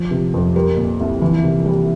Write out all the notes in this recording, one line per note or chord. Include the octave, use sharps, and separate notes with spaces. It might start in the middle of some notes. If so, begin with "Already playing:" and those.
Already playing: F3
C3
F2
G3 A#4
A#2
C2
E3
C3
G3